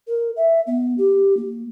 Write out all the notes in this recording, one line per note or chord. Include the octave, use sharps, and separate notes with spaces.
A#4
E5
B3
G4
A#3